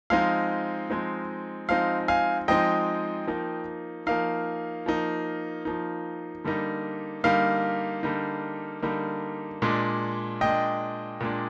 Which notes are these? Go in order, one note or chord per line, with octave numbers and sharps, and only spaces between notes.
F3 G#3 C4 D#4 F5
F3 G#3 C4 D#4
F3 G#3 C4 D#4 F5
F5 G#5
F3 G#3 C4 D#4 D#5 G5
F3 A#3 D#4
F3 A#3 D#4 F5
F3 A#3 D#4
F3 A#3 D#4
D3 G3 A#3 D#4
D3 G3 A#3 D#4 F5
D3 G3 A#3 D#4
D3 G3 A#3 D#4
A#2 G#3 D4
A#2 G#3 D4 D#5 G5
A#2 G#3 D4